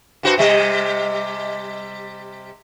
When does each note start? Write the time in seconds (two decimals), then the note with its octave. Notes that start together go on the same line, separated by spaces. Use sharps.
0.23 G2 F#4 C5
0.38 C3 G3 D#5